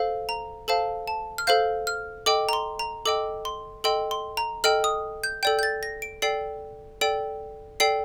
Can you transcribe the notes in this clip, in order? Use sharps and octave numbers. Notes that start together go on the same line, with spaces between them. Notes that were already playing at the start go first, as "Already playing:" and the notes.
Already playing: A4 C5 F5
A#5
A4 C5 F5 A5
A5
F6
A4 C5 F5 G6
F6
A4 D#5 G5 D6
A#5
C6
A#5
A4 D#5 G5 D6
C6
A4 D#5 G5 C6
C6
A#5
A4 D#5 G5 F6
D#6
G6
A4 D5 G5 G6
G6
A6
A#6
D7
A4 D5 G5 C7
A4 D5 G5 D7
A4 D5 G5 C7